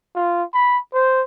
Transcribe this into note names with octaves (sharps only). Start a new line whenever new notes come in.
F4
B5
C5